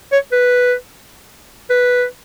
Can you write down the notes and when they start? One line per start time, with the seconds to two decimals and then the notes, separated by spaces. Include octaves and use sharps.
0.12 C#5
0.32 B4
1.70 B4